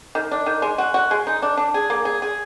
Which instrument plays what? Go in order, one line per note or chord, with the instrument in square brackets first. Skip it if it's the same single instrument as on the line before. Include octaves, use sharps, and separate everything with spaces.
[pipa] D#3
D4
D#3
G#3
F#4
F#4
G#3
D#4
D4
D4
G#4
A#3
G#4
G#4